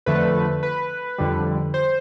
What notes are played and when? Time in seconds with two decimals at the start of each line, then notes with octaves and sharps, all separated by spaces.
0.06 F2 D3 A3 B4
0.63 B4
1.18 F2 D3 G3
1.74 C5